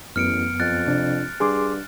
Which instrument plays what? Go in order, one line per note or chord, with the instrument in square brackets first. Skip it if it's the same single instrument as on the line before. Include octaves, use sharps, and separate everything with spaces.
[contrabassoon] A1 [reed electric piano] F#2 B3 [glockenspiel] F6 C#7 D7
[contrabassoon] F2 [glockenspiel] F#6 A6
[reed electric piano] C3 D4
[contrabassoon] G2 [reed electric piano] G#4 C6 D6